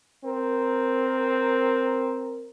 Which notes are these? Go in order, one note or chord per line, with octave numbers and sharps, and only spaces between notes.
C4 A#4